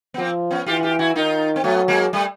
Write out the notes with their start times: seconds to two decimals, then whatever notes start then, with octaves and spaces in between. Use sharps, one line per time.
0.14 B3
0.18 F3 A#3 C4
0.51 B3 C#4
0.66 E3 F4 G4
0.79 F#4
0.83 F4 G4
0.99 E4 F#4
1.15 D#3 D#4 F4
1.56 C4
1.64 F#3 A3 B3
1.88 G#3 A#3
2.13 G3 A3